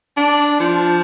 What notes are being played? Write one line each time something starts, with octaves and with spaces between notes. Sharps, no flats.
D4
F3